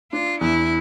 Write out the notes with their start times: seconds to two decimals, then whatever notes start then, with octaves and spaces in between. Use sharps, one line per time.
0.12 D4 F4
0.41 E2 E4